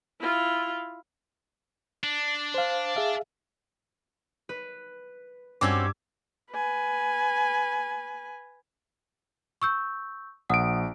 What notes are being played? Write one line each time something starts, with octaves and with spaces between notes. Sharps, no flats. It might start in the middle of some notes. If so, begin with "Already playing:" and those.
E4 F4
D4
C5 F5
G#4 E5 F5
B4
G2 C4 C#4 F#4 D6 E6 G#6
B4 G#5
C#6 E6 G6
A#1 F#5 D#6 D7